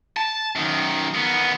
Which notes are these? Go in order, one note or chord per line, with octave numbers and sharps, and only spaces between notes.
A5
F#2 D#3
D#3 B3